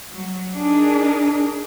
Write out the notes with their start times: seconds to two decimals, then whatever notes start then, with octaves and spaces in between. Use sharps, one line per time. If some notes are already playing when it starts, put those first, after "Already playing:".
0.11 F#3
0.56 D4 D#4 G#4 A#4